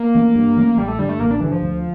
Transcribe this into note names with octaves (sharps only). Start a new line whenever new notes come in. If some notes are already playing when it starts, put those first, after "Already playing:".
Already playing: A#3
E3 A3 C#4
G2
E3 A3 C#4
A1 G3
A3
G2 D3 G3
A3
A1 A#3
D4
G2 D3 E3
F3
D2